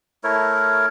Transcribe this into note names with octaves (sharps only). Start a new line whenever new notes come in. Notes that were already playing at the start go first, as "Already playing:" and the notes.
A3 E4 A#4 C#5